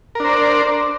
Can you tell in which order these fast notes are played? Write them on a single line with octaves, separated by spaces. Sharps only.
A#4 D4 C5 D5